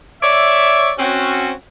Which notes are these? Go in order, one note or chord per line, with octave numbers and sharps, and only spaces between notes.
C#5 D5 E5
C4 C#4 F#4